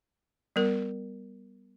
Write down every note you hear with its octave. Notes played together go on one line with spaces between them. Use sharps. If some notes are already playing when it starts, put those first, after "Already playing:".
G3 B3 A#4